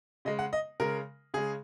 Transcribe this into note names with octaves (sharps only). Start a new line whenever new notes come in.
C#3 G#3 D#5
F#5
D#5
C#3 G#3 A#4
C#3 G#3 G#4